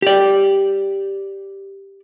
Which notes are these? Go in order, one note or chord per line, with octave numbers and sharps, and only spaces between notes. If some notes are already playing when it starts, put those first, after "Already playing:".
G4 D5